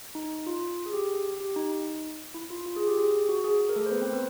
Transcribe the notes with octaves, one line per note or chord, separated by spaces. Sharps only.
D#4
F4
G#4
G4
G4
D#4
D#4
E4
F4
F4
G#4
G4
G#4
F#4
G#4
G#4
A#4
A3 A4
C5
B3 B4
C4 C5
B3 B4